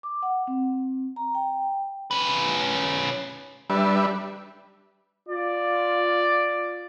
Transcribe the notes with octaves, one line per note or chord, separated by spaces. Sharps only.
D6
F#5
C4
A#5
G5
C#4 B4
G3 D4 B4 E5
F4 D5